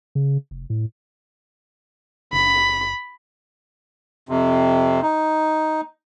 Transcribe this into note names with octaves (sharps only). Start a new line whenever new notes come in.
C#3
F1
A2
F#1 B5
F2 C3
D#4